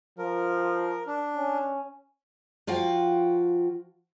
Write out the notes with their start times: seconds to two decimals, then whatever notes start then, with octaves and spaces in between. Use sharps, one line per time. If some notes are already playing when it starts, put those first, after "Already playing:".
0.18 F3 A#4
1.07 D4
1.36 C#4
2.67 F3 F4 F#4 F5 G5